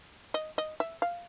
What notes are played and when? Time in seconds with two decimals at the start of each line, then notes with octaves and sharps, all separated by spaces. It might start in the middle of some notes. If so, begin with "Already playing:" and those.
0.34 D#5
0.58 D#5
0.80 E5
1.02 F5